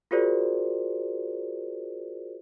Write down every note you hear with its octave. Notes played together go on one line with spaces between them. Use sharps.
F4 F#4 G#4 A#4 C5 D5